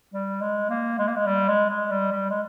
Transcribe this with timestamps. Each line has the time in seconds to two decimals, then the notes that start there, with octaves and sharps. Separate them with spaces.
0.14 G3
0.41 G#3
0.70 A#3
0.99 G#3
1.08 A#3
1.16 G#3
1.26 G3
1.48 G#3
1.70 G#3
1.91 G3
2.12 G3
2.30 G#3